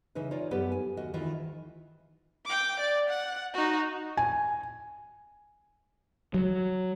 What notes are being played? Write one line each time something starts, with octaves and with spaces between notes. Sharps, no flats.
C#3 E3 D#4 B4
D#4 F4 C#5 D5
F#2 B3 G4 A4 B4 F#5
G#5
D#2 F#4 D#5
D2 D#3 E3 F4 D#5
G5 D6
D5
F#5
D#4 F#4
G#5
F#3